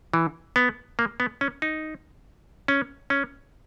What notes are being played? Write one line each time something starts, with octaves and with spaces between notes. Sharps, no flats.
E3
B3
A#3
B3
C#4
D#4
C#4
C#4